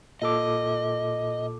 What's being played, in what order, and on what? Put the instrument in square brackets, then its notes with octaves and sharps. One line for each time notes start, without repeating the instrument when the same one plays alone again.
[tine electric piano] A#2 A4 D6 [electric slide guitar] D#5